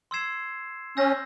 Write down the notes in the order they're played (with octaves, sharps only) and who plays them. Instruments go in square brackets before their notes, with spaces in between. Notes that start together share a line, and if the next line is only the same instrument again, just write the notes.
[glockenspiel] C6 E6 G#6 C7 E7
[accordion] C#4 [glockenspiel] E6 G6 A#6